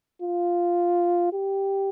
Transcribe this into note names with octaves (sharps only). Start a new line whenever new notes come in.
F4
G4